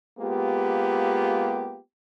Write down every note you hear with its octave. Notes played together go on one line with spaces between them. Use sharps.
G#3 A#3 B3 F4 G4